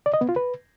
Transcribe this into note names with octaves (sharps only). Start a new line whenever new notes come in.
D5
D#5
B3
F4
B4